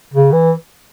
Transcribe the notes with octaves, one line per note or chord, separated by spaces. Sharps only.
C#3
E3